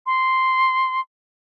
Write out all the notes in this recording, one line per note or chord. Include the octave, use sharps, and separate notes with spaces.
C6